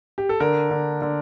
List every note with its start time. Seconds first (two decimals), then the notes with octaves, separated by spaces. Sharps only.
0.18 G4
0.29 A4
0.40 D3 A#4
0.71 D3
1.02 D3